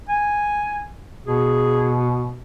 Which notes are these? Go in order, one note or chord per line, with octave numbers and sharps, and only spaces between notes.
G#5
B2 G#4